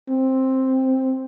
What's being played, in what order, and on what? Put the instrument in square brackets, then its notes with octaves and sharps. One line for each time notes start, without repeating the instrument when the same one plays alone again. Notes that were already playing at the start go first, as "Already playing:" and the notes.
[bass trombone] C4